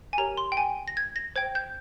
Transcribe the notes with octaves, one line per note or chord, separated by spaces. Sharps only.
G#5
G4 A#4 C#5 A#5
C6
G5
G#5
A#6
G#6
A#6
C5 G5 G#6
G6